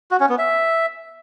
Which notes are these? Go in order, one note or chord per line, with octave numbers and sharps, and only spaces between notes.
F#4
C#4
B3
E5